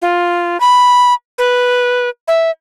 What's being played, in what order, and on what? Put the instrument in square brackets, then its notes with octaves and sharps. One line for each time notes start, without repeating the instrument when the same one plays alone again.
[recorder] F4
B5
B4
E5